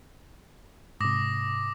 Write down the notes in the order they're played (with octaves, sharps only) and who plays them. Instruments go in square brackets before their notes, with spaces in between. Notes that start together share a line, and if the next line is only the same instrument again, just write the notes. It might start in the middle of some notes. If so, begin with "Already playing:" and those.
[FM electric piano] G#2 C3 [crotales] D6 D#6 A#6